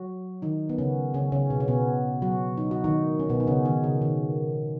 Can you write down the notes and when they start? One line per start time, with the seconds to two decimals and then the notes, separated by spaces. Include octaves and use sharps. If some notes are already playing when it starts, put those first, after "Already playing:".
Already playing: F#3 F#4
0.42 D#3 D#4
0.69 B3
0.78 C#3 C#4
1.14 C#3 C#4
1.32 C#3 C#4
1.50 B2 B3
1.60 C#4
1.68 B2 B3
2.22 F#3 F#4
2.58 D#4
2.71 F#4
2.84 D#3 D#4
3.19 C#4
3.29 B2 B3
3.40 D#4
3.47 C#3 C#4
3.65 D#3 D#4
3.84 C#3
4.02 D#3